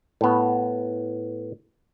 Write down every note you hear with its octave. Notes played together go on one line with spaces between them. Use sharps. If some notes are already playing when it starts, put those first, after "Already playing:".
A2 B3